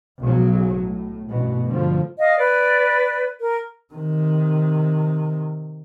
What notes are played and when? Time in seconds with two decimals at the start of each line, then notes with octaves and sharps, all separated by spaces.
0.23 B1 C#3 F#3
0.79 A2
1.29 A1 G2 B2
1.68 G2 D3 F3
2.19 D#5 F5
2.37 B4 D5
3.39 A#4
3.94 C3 D#3